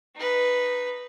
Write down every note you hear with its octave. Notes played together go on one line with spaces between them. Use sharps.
D#4 B4